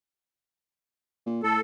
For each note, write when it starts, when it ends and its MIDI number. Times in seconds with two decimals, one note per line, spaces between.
1.26 1.40 46
1.43 1.59 45
1.43 1.61 69